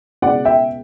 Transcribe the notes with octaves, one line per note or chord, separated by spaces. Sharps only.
C#2 B2 D5 F#5
E5 G5